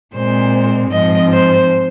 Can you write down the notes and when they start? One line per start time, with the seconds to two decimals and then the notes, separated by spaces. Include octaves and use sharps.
0.15 A#2 G#3 C4 C5
0.93 G#2 F3 C4 D#5
1.32 C5